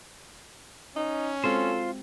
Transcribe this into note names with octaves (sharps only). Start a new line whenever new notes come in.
C#4 D#4
G#3 C4 F4 F#4 A4 C5